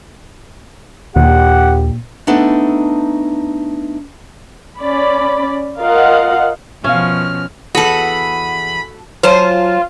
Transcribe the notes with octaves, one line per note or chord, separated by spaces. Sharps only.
A#1 D#2 A#2 G4 F#5
A3 B3 D4 D#4 A4
C#4 D5 B5
F4 A#4 D#5 F5 F#5
B2 F3 C#4 E5 F5 F6
E2 F#4 G#4 A4 B5
F#3 F4 C5 G#5 A5